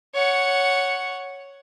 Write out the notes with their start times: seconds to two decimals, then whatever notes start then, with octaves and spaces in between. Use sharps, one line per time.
0.15 C#5 F#5